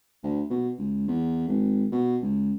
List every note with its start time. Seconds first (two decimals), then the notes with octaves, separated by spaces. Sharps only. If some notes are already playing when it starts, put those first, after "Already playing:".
0.23 D2
0.50 B2
0.78 C#2
1.08 E2
1.48 G#1
1.92 B2
2.22 C#2